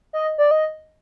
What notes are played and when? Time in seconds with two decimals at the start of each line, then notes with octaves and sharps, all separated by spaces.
0.13 D#5
0.38 D5
0.51 D#5